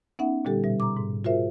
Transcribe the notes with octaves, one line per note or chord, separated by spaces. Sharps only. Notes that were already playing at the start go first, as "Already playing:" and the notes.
B3 C#4 D#4 E5 F#5
A#2 D3 G3 G4 A4
B2 G3 E5
A#5 D6
G#2
F4 F#4 G#4 A#4 C5 E5